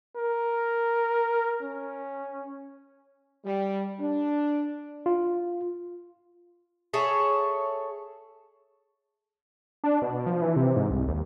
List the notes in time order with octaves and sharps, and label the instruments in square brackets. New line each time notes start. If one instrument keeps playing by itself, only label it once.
[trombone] A#4
C#4
[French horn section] G3
D4
[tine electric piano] F4
[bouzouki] G#4 A4 C#5 E5
[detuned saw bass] D4
B2
F3
E3
C3
G#2
C2
D#2